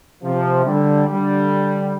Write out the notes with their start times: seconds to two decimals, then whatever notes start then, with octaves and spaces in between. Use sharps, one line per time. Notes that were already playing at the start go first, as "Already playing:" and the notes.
0.23 C3 F3
0.65 D3 G3
1.08 D3 G3